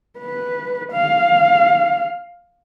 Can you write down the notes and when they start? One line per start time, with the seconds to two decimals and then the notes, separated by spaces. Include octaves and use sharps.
0.19 B4
0.92 F5